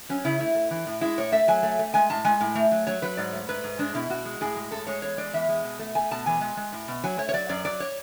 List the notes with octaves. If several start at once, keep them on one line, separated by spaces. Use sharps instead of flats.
F#3 C#4
C#3 E4
A3 E4
A3
E3
A2
G#3 E4
A2 C#5
A3 E5
F#3 G#5
A3
A3
G#3 G#5
A2 A5
G#3 G#5
A2
A3
F#3
F#3 C#5
F#3 B4
G#2 D5
A3
G#2 B4
G#2
G#3 D4
B2 E4
B2 F#4
G#3
A2 G#4
G#3
A2 A4
G#3 C#5
E2 C#5
G#3 D5
E2 E5
G#3
B2
A3
A3 G#5
B2 A5
E3 G#5
G#3
G#3
A2
B2
F#3 G#5
A3 C#5
C#5
F#3 D5
F#2 D5
F#3 D5
C#5